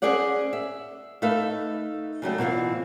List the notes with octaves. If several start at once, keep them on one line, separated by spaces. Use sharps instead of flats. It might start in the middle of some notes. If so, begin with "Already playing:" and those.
C#4 G#4 C5 D5 F#5
E5
A3 D#4 B4 E5 F5
C#3 F#3 G3 A3
B2 E3 C4 F4